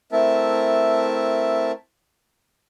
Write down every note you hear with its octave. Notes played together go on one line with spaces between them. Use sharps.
A3 C4 E4 A#4 E5 A5